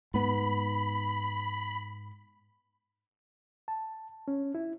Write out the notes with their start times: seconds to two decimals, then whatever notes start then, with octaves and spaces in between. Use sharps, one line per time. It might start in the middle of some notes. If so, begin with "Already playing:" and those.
0.14 G#2 B3 B5
3.68 A5
4.28 C#4
4.55 E4